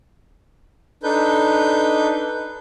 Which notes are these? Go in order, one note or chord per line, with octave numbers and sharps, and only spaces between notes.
D4 D#4 A4 B4 G6